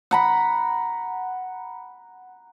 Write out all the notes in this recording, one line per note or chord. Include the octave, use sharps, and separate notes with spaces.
F#5 A#5 B5